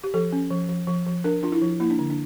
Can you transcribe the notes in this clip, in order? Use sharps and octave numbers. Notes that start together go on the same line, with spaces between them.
G4
F3 A4
C#4
F3
F3
F3
F3
D4 A#4
D4 F4
E4
F3
A#3 E4
D4
D3
D4